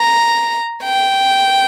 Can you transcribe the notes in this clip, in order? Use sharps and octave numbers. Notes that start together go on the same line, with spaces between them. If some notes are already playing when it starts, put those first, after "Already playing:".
Already playing: A#5
G5